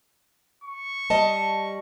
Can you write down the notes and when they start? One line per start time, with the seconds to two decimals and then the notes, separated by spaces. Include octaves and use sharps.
0.64 C#6
1.10 G3 D#5 A5